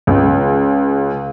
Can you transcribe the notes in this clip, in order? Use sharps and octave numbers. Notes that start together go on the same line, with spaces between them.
C#2